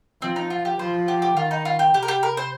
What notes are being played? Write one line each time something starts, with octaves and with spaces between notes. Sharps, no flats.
F3 C4
D#4
F4
G4
F3 C5
G4
G4
D#3 F4
D#4
F4
G4
C3 G4
A#4
G4
A#4
C5